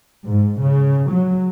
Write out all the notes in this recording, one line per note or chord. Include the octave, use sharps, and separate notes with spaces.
G#2
C#3
F#3